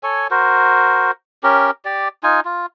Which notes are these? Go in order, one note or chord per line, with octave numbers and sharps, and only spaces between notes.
A4 C#5 G#5
F#4 A#4 C5
C#4 G4 A#4
G4 D5
D#4 F4 G#5
F4